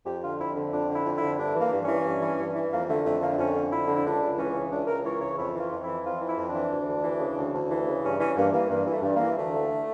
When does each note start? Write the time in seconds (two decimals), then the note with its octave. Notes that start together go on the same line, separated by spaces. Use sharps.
0.05 F2 G4
0.21 D3 F4
0.38 F2 E4
0.55 D3
0.72 F2 D4
0.88 D3
0.94 E4
1.05 F2
1.16 E4
1.22 D3
1.38 G2 D4
1.55 E3 A#3
1.72 G2
1.82 C#4
1.88 E3
2.05 G2
2.21 E3
2.38 G2
2.55 E3
2.71 F2 A#3
2.87 D3 A3
3.04 F2 A3
3.21 D3 A#3
3.38 F2 C#4
3.54 D3
3.71 F2 E4
3.88 D3
3.95 E4
4.04 C#2 D4
4.21 C#2
4.38 E3 C#4
4.54 C#3
4.71 C#2 D4
4.87 C#2 A#4
5.04 E3 C#5
5.20 C#3 C#5
5.37 F2 E4
5.54 E3
5.59 F4
5.70 F2
5.82 E3 E4
6.04 F2 F4
6.20 E3
6.26 E4
6.37 F2
6.48 D4
6.54 E3
6.70 D2
6.87 D2
7.04 E3
7.20 C#3
7.37 D2
7.54 D2
7.70 E3
7.87 C#3
8.03 G2 C#4
8.20 E3 C#4
8.36 G2 A#3
8.53 E3 A#3
8.70 G2 A#3
8.87 E3
8.92 A3
9.03 G2
9.15 A#3
9.20 E3
9.36 D2 A3
9.53 D3